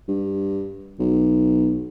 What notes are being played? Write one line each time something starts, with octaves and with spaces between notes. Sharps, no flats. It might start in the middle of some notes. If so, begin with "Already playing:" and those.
G2
B1